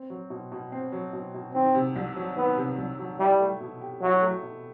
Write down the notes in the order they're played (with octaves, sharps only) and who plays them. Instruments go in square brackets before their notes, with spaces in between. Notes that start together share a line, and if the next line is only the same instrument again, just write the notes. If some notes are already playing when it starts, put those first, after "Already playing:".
Already playing: [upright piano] C4
F#3
B2
B2
C4
F#3
B2
B2
[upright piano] D#3 [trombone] C4
[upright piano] C3
C2
F#3
[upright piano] D#3 [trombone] B3
[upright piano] C3
C2
F#3
[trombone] G3 [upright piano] E4
[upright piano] A3
B2
G4
[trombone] F#3 [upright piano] E4
[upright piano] A3
B2